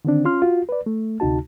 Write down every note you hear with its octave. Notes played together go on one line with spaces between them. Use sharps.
D3 D#3 C4 D4
C#4 F4 C6 F6
F4 F#4
B4 D5
A3
D2 C3 D#4 F#4 A5